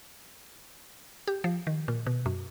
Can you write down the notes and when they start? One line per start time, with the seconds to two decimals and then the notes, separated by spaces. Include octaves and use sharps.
1.27 G4
1.44 F3
1.67 D#3
1.88 A#2
2.06 B2
2.26 F#2